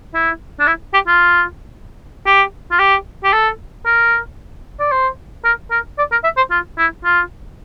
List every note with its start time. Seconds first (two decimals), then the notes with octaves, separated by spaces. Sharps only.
0.14 E4
0.59 D4
0.67 E4
0.93 G4
1.07 F4
2.26 G4
2.71 F4
2.79 G4
3.23 G4
3.33 A4
3.85 A#4
4.79 D5
4.91 C5
5.44 A#4
5.70 A#4
5.98 D5
6.11 A#4
6.24 E5
6.37 C5
6.50 F4
6.78 E4
7.04 F4